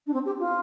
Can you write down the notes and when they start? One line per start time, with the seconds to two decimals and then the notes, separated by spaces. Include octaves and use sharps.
0.06 D4
0.13 C4
0.25 G4
0.39 F4